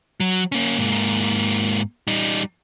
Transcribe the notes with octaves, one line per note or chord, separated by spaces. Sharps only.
F#3
A#3 C#4
G#2 A#3
G3 D#4